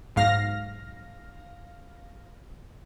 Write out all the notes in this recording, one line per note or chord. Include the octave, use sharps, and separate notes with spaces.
B1 G#2 F5 F6 A#6